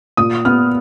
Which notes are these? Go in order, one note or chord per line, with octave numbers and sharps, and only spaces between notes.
A#2 D#6
B3 F6